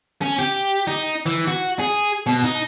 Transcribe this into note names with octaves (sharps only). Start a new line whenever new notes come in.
C#4
G4
D#4
E3
F#4
G#4
B2
D#4